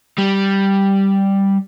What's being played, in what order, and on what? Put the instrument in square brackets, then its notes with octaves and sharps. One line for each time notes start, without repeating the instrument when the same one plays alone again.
[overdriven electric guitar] G3